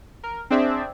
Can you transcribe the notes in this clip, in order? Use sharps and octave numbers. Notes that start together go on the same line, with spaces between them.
A#4
C4 D4 G#4 D5 E5